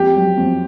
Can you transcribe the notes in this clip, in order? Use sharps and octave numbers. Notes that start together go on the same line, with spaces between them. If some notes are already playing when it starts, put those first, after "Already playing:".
Already playing: F2 G4
F#3
F2